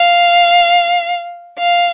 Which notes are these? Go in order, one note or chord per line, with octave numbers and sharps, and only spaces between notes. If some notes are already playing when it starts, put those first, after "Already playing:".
Already playing: F5
F5